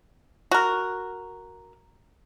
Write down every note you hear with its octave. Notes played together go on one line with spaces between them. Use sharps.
F#4 A#4